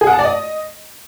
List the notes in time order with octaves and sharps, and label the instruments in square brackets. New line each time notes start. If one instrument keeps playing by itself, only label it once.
[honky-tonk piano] G#4
F#5
A5
D5
D#5